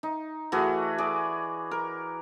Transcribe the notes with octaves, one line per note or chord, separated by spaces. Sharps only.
D#4
E3 A3 F#4 G#4
G#4 D5
A#4